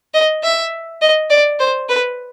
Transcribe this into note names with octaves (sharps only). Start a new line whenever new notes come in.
D#5
E5
D#5
D5
C5
B4